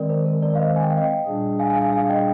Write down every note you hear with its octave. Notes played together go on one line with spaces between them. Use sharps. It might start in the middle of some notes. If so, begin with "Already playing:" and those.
Already playing: D#3 G#3 C4 A#4 D5
C5
A#4
A#4 D5
F5
C5 D#5
G#5
G5
F5
D#5 G5
A#2 G3 D4 G#4
F5 G#5
F5 G#5
F5 G#5
F5 G#5
D#5 G5